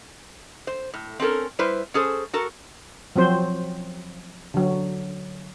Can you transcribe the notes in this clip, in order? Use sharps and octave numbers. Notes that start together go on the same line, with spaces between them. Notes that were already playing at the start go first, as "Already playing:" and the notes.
C5
A2
C4 C#4 A4 A#4
G3 E4 B4 C5
C#4 G#4 A4 C5
F#4 A4 A#4
F3 F#3 C4 C5
D3 F#3